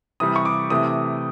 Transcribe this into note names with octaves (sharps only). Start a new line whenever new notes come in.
C3 E3 G3 D#6
C#6
D6
C3 E3 A3 D#6